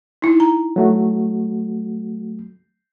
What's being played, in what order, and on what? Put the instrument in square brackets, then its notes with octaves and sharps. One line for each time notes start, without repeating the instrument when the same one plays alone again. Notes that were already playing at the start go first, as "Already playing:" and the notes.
[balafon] D#4 E4
A#5
[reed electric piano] F#3 A3 F#4